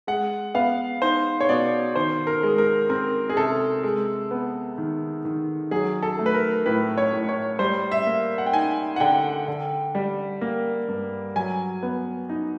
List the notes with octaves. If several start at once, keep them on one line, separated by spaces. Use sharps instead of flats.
G#3 F#5
B3 F5
D#4 C5
C#5
B2 D5
D#3 C5
A#4
G#3
A#4
C4 A#4
G#4
C3 A4
G#3
B3
D#3
D#3
F#3 G#4
A4
A3
B4
A#4
A2 B4
C#5
A2
C#5
G3 C5
E5
A#3
F#5
G5
D#4 G#5
F#5
D3 G5
D3
G3
A#3
G2
F#3 G#5
B3
D#4